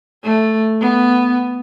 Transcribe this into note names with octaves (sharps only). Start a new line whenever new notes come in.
A3
B3